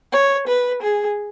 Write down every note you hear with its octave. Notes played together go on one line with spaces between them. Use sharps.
C#5
B4
G#4